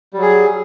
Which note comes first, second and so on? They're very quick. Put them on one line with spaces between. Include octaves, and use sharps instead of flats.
G3 F#3 G#4